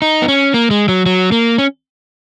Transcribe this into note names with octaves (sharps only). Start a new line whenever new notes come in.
D#4
B3
C#4
A#3
G#3
F#3
F#3
A#3
C#4